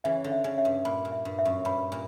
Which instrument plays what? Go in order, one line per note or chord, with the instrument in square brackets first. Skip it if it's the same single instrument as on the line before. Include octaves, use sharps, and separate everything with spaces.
[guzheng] C#3 E3 [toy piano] E5
[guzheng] D3
[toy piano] E5
[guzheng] C#3
[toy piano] E5
[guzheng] G2
[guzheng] A#2 [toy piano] B5
[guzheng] A#2
[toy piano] E5
[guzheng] G2
[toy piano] E5
[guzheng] F#2
[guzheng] G2 [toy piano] B5
[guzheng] A#2